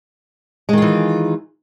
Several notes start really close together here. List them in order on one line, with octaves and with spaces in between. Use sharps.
G#3 D#3 F4 E3